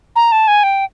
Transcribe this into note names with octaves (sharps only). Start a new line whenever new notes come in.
A#5
A5
G#5
G5